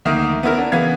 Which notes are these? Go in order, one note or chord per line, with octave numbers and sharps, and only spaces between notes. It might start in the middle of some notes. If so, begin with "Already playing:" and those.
D2 D#3 A#3 E5 D#6
B3 C#4 E4 A#4
D4
C#3 E3 B3 F5 G#6